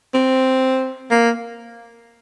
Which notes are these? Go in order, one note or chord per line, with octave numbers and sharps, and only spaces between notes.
C4
A#3